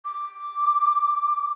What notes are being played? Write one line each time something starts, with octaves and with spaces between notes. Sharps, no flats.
D6